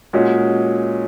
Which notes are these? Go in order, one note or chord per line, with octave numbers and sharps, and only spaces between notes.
A#2 G#3 C#4 F#4